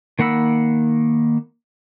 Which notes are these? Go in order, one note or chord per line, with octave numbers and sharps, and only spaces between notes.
D#3 A#3 F#5 B5 E6